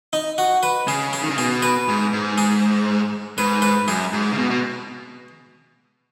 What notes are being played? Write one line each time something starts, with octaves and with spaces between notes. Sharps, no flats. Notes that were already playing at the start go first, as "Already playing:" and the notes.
D#4
F#4
B4
C#3 G#4
G#4
D#3
C#3
B2 G#4
B4
G#2
G#2
G#4
G#2 B4
B4
F#2 G#4
G#2
C#3
B2
B2